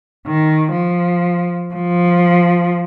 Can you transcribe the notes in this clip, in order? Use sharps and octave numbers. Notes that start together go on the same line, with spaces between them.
D#3
F3
F3